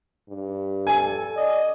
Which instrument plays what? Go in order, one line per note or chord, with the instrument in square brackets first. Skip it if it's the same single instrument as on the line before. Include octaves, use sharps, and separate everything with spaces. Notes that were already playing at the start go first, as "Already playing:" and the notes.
[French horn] G2
[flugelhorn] A4 [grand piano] G#5
[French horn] D5 [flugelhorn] D#5